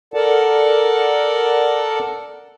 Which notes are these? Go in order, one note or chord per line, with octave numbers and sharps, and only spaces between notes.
A4 A#4 D5 F#5 A5